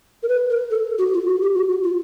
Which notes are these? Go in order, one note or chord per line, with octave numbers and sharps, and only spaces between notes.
A#4
B4
A#4
A4
F#4
F4
F#4
G4
F#4
F#4
F4